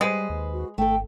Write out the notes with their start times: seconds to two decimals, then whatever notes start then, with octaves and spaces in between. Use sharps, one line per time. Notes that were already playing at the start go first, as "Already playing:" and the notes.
0.01 G3 G#3 B4 C5
0.30 D#2
0.54 F#4
0.78 G#1 A3 A4 G5